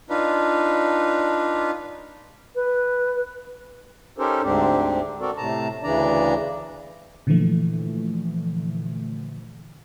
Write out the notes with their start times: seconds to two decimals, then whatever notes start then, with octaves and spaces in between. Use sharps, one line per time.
0.10 D4 D#4 F4 B4
2.55 B4
4.18 C#4 D#4 G4 A4 A#4 C5
4.43 D2 G#2 C4 D4 G4
5.21 C4 F#4 A4 A#4 D5
5.37 A2 C3 A5 A#5
5.83 D2 C#3 E3 D4 D5 A#5
7.27 A#2 D3 E3 F3 A3